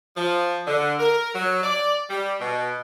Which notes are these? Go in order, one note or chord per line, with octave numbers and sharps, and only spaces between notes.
F3
D3
A#4
F#3
D5
G3
B2